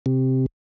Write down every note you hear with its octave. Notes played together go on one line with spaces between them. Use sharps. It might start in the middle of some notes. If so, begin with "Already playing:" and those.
C3